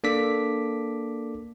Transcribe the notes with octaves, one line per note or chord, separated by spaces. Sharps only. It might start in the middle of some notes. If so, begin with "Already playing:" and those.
A#3 D4 A4 D6 B6